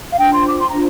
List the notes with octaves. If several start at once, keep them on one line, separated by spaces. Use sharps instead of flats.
F5
D4 F4 C5 G5
C6
D6
C6
D4 F4 C5 A#5